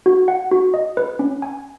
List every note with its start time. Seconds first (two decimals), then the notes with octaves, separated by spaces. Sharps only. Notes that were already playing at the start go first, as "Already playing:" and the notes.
0.06 F#4
0.28 F#5
0.51 F#4
0.74 D#5
0.97 B4
1.19 C#4
1.42 G#5